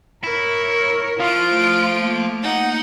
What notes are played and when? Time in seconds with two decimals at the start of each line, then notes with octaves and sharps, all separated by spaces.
0.24 E4 A#4 C#5
1.20 F3 E4 F4 F5 D7
1.53 A3
1.99 A#3
2.43 D#4 F#5